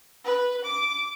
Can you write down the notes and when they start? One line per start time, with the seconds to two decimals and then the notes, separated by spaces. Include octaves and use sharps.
0.25 B4
0.65 D6